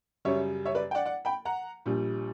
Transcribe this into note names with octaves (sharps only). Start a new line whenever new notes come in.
F#2 C#3 G3 C#5 E5
C#5 E5
B4 D5
G5
D5 F#5
D5 F#5
G5 B5
F#5 A#5
A#1 A#2 G3